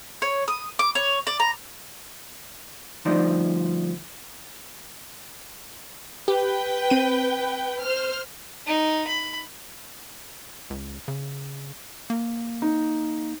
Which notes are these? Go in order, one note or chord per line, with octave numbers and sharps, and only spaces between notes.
C#5
D#6
D6
C#5
D5
A#5
D2 G2 F3 D#4 C5 D5
G4 B4 G5
C4 D#7
C5 F6
D#4
B5
C#2
C#3
A#3
D#4